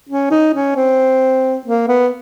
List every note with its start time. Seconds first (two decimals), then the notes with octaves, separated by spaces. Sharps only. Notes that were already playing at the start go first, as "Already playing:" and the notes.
0.10 C#4
0.31 D#4
0.54 C#4
0.76 C4
1.66 A#3
1.88 B3